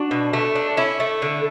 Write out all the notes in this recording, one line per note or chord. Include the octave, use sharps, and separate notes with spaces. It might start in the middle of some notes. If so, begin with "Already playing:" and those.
Already playing: D4 F#4
B2
A3
D4
C#4 E4
A3
D3